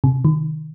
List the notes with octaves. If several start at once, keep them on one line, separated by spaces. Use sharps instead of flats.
C3
D#3